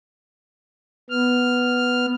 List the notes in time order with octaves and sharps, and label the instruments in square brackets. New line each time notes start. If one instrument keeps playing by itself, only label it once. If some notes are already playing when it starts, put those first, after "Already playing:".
[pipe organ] B3 F6